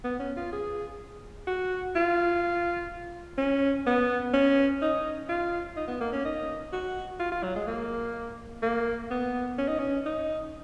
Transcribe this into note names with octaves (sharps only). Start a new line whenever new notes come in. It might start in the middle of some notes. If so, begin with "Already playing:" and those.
B3
C#4
F4
G#4
F#4
F4
C#4
B3
C#4
D#4
F4
D#4
B3
A#3
C#4
D#4
F#4
F4
F4
F#3
G#3
A#3
A#3
B3
C#4
D#4
C#4
D#4